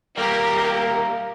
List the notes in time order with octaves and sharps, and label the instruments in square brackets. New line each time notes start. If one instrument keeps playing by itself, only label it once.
[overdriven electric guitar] G3 A#3 [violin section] G4 A#4